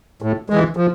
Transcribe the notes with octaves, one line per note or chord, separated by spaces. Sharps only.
A2
E3 G#3
F3